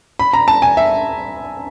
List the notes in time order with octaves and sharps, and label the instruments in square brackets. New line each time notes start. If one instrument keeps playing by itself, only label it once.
[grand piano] B5
A#5
A5
G#5
E5